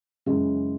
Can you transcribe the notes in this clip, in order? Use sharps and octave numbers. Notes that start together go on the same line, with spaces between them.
F#2 C#3 E3 G#3